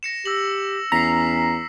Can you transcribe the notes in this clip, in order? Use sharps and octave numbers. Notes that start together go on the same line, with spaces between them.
A#6 C#7 E7
G4 E6 A#6 F#7
E2 C#4 A#5 B6 C7